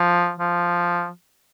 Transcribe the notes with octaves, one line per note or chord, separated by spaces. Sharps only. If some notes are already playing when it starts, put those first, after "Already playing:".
Already playing: F3
F3